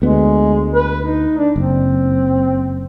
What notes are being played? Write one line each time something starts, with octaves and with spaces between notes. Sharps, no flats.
D2 G#3 B3
B4
D#4
D4
F#1 C4